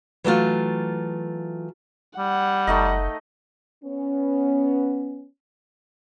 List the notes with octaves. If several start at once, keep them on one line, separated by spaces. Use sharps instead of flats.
E3 F#3 A3 F4
G3 F#5
F#1 A3 D#4 D#5
B3 C#4